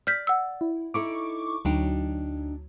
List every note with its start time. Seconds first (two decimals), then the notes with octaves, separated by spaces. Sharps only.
0.07 D5 F6 G6 B6
0.27 F#5 E6
0.61 E4
0.94 D#4 E4 A4 C#6 D6
1.65 D2 F#3 D4 D#4 G5